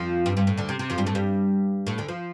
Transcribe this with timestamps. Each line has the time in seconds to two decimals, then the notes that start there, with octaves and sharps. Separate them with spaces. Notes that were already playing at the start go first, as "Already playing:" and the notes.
Already playing: F2 F3
0.26 G2
0.37 G2
0.47 A2
0.57 D2 D3
0.69 C3
0.79 C3
0.90 F2 F3
0.98 G2 G3
1.07 A2 A3
1.15 G2 G3
1.87 A2 A3
1.98 D2 D3
2.08 F3